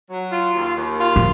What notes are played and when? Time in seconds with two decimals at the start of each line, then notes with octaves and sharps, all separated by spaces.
0.09 F#3
0.32 F4
0.54 D#2
0.77 D#2
1.00 F4
1.16 F3